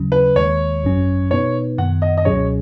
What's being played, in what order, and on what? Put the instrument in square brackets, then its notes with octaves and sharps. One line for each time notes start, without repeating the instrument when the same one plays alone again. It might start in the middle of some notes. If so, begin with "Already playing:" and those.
Already playing: [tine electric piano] D#2 C#3 F#3 C#4
[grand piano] B4
[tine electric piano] D#2 D#3 G#3 [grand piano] C#5
[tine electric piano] G#1 F#2 F#3 C#4
[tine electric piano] B2 B3 D#4 B4 [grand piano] C#5
[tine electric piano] F#2 D#3 B3 [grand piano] F#5
[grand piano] D#5
D#5
[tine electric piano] C#2 B2 F#3 C#4 G#4 [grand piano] C#5